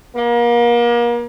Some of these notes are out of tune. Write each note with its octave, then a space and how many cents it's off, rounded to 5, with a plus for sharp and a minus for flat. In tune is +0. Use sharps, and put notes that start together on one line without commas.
A#3 +35